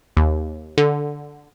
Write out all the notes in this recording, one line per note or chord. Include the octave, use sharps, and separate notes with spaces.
D#2
D3